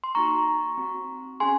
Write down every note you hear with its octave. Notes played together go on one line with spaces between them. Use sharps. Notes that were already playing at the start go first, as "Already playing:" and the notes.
C6
A#3 D#4 F#4 A#5 C#6
C4 F#4
C#4 G#4 G#5 C6